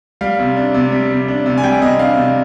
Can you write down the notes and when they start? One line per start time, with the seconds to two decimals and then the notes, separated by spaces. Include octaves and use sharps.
0.21 G3 F5
0.39 C3
0.57 D4
0.74 C3
0.92 G3
1.10 C3
1.28 D4
1.46 C3
1.58 G#5
1.63 G3 G5
1.82 C3 D#5
1.99 D4 F5
2.17 C3